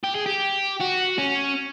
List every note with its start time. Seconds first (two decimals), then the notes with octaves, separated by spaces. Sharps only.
0.03 G4
0.15 G#4
0.26 G4
0.81 F#4
1.18 C#4